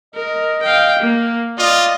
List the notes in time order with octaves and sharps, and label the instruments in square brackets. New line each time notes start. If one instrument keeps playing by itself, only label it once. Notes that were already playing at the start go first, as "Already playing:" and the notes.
[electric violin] A#4 [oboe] D#5
[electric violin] F5 G5
A#3
[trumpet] F4 [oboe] D5 [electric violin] D#5